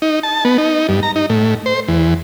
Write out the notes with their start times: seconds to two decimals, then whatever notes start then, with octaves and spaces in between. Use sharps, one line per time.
0.02 D#4
0.23 A5
0.45 B3
0.58 D#4
0.89 G2
1.03 A#5
1.16 D#4
1.30 A2
1.66 C5
1.88 E2